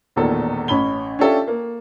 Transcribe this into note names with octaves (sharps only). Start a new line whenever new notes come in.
E1 E2 A#2 D#3 A3 A4
A1 C#4 B5 G7
C#4 D4 F4 G4 A4 E5
A#3